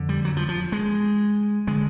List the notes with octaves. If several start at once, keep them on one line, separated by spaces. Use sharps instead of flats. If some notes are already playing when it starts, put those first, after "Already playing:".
Already playing: F2 D3
G3
F#3
F3
F3
G#3
D3 G#3